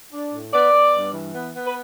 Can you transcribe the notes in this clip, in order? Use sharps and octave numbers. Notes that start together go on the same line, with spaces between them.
D4
A2
B3 D5
B3
G2
E3
B3
B3
B4